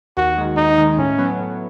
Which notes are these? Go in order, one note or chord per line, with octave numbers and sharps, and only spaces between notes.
D#2 F#4
D#3 G#3
D#2 D#4
D#3 G#3
A2 C#4
F#3 B3
A2